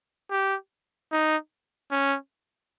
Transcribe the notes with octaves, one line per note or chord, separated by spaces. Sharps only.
G4
D#4
C#4